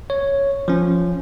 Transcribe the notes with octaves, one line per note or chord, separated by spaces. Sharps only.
C#5
F3 C#4